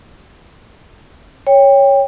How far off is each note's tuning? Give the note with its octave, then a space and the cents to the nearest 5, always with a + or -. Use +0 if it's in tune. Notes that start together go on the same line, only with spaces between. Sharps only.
C#5 +0 G5 +20